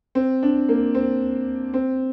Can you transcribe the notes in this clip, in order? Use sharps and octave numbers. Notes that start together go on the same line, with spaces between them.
C4
D4
A#3
C4
C4